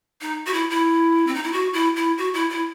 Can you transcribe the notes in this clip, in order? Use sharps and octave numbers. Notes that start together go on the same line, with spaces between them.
D#4
F#4
E4
E4
C4
D#4
E4
F#4
E4
E4
F#4
E4
E4